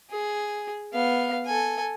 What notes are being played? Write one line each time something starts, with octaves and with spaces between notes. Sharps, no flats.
G#4
B3 F5
A4 G#5